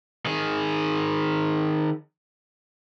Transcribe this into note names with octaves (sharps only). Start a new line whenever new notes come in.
D#3 G#4